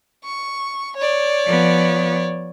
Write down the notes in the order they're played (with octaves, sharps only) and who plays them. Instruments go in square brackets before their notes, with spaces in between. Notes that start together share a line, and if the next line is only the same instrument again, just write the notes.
[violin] C#6
C#5 D5
[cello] F3 B3